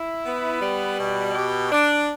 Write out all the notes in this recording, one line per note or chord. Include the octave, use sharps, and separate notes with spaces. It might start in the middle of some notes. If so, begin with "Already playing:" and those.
Already playing: E4
B3
G3
B2
G4
D4